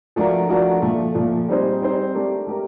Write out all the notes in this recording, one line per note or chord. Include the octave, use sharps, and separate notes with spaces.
F3 A3 D4 F#4 A#4
F3 A3 D4 F#4 A#4
A#2 F3 A3
A#2 F3 A3
G3 C4 D#4 G#4 C5
G3 C4 D#4 G#4 C5
A3 D4 G4 A#4
A3 D4 G4 A#4